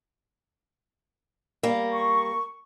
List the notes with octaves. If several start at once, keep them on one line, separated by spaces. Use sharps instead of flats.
G3 A#3
C#6